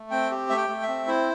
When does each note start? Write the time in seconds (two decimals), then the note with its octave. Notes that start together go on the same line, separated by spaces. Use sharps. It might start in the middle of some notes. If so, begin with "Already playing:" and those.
Already playing: A3
0.11 C4 G5
0.31 G4
0.50 A3 E5
0.57 G5
0.69 A3
0.83 E5
0.88 C4
1.08 E4 C5